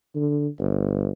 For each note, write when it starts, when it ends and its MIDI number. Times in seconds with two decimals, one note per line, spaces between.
0.15 0.48 50
0.59 1.10 31